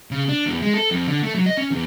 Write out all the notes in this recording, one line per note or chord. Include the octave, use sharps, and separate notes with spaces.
C#3
D4
E2
G#3
A4
F2
D3
A3
F#3
D#5
C#4
E2